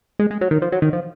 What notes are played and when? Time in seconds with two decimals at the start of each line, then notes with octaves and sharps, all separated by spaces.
0.19 G#3
0.31 G#3
0.41 F#3
0.51 D#3
0.62 F3
0.72 F#3
0.82 D#3
0.93 F3